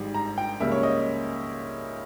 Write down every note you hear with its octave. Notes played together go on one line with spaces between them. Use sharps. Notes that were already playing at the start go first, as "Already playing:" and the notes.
Already playing: G#1 G#2 G3
A#5
G5
C#2 C#3 G3 A#3 E5
C#5
D#5